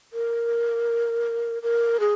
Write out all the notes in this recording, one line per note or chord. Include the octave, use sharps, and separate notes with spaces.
A#4
A#4
G#4